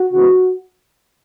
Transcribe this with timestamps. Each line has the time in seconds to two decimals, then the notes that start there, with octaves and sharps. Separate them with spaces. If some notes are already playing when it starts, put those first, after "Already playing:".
Already playing: F#4
0.14 C#3 E3 G#3 B3